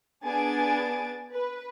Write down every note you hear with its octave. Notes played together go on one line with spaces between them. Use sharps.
B3 D4 G#4 G#5 A6 D7
B4